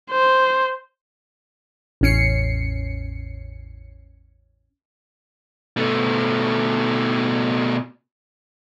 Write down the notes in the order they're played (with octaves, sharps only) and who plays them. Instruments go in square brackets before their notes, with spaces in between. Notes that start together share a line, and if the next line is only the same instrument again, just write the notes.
[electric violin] C5
[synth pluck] A1 E2 C#4 C7 C#7
[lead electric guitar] B2 A3